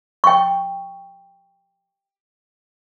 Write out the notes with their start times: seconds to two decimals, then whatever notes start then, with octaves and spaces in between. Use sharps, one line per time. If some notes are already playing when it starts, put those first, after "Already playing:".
0.24 G5 C#6